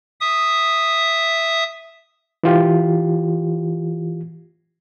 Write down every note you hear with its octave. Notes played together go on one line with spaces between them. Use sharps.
E5 D#6
E3 F4 G4